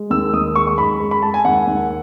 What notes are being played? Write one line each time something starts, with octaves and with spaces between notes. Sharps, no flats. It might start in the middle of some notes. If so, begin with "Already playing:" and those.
Already playing: G#3
D#2 E6
D#2 D#6
G#3 C#6
C#6
F#2 B5
G#3
B5
G#3 A5
G#5
D#2 F#5
D#2